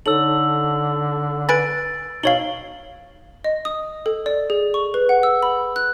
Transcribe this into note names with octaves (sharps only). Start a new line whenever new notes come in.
D3 D#4 A4 C#5 E6 F#7
B4 G#5 B5 A6 D7
B2 D#4 C#5 F5 F#7 G7
D#5
D#6
A4
D5
G#4
C#6
B4
F#5
E6
B5
F#6